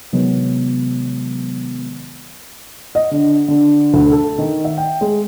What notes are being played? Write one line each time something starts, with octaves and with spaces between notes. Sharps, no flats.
C3 D#3 F#3 G#3 B3
D#5
D3
D3
D2
A4
D#3
E5
G5
G#3